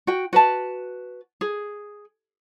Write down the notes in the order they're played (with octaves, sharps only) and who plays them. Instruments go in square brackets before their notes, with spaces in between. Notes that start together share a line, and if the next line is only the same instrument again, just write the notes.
[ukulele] F#4 G5
F#4 B4 A5
G#4